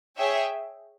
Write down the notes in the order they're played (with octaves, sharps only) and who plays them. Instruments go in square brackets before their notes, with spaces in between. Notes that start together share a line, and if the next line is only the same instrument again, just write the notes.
[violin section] G#4 C#5 E5 G5